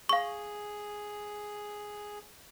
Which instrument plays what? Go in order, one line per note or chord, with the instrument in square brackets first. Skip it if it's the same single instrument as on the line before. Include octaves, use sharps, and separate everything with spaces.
[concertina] G#4 [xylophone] F5 C#6